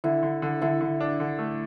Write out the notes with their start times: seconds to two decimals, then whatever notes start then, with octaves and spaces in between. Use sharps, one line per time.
0.04 D3 E4
0.23 D3
0.42 D3
0.61 D3 E4
0.81 D3
1.00 D4
1.20 D3
1.39 A3